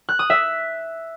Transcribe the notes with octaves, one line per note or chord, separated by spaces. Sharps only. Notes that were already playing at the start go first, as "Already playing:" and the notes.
F#6
D#6
E5